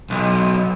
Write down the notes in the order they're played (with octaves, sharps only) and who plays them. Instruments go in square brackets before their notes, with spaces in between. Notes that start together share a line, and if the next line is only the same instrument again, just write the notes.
[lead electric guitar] B1